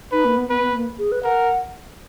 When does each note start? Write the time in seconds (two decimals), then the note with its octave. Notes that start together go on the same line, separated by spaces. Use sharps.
0.12 D#4 B4
0.25 A#3
0.37 B3
0.50 B3 B4
0.62 B3
0.74 A#3
0.99 G#4
1.12 B4
1.24 A#4 F#5